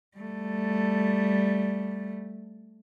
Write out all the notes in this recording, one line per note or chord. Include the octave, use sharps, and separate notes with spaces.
G3 A3